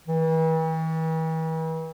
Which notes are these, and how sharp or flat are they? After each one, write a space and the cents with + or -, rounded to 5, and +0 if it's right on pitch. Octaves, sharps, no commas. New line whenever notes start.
E3 -40